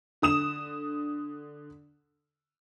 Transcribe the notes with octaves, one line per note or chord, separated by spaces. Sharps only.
D3 D#6 E7